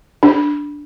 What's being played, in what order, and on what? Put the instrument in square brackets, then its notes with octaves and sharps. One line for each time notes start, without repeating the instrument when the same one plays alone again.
[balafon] D4